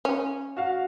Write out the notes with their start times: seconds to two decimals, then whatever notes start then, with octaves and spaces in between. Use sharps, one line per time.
0.05 C#4
0.57 F#4 F5